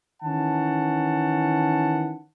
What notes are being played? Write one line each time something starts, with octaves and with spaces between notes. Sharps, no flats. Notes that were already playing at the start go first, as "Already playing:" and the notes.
D#3 E3 C#4 F#5 A5